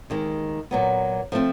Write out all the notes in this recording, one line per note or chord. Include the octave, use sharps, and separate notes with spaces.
D#2 D#3 G#3
A#2 F#3 B3
F3 A3 C4 F4